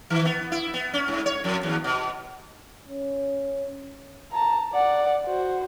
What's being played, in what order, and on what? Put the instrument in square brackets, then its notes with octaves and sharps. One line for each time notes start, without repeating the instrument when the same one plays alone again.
[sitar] D#3
B3
E4
B3
C#4
G#2
C#5
F2
D#2
B2
[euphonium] C#4
[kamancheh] A5 A#5
D5 F#5
F#4 C5